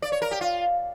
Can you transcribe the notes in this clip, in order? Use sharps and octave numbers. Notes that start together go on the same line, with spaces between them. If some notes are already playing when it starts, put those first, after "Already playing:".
D5
C#5
A#4
G4
F4